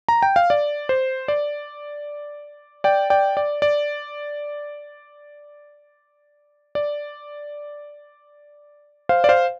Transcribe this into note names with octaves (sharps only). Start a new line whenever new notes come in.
A#5
G5
F5
D5
C5
D5
D5 G5
D5 G5
D5
D5
D5
C5 F5
D5
C5 F5